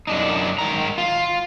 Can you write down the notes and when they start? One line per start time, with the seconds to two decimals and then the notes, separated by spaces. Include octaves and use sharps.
0.07 F#2 D4 D#4
0.59 G#2 D#3 A#5
0.98 F4